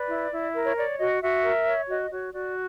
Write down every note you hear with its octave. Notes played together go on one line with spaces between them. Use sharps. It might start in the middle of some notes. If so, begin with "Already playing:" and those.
Already playing: B4 D5
E4
E4
A#4
C#5
C#5 D5
F#4 D#5
F#4 E5
A#4
C#5
F#4 D#5
F#4 C#5
F#4 D5